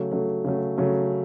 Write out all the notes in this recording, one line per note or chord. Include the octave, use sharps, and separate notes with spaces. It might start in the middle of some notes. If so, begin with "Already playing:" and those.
Already playing: C#3 F#3 A3
C#3 F#3 A3
C#3 F#3 A3
C#3 F#3 A3